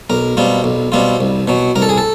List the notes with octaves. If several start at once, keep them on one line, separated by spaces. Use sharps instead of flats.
B1 A#4
B2 G3 C4 F4
B1
B2 G3 C4 F4
C2
B2 F#3
C2 A#4
A4
G#4
A4